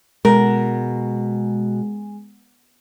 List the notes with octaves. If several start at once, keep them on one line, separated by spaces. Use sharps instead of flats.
B2 G#3 A#4